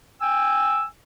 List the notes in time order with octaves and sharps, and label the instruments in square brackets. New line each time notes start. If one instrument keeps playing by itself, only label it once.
[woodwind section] G5 G#5 E6